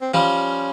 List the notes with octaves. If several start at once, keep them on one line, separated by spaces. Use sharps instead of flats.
C4
F3 G3 C#4